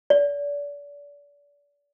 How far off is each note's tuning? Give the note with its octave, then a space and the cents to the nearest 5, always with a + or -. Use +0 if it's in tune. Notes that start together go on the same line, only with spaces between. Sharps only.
D5 -35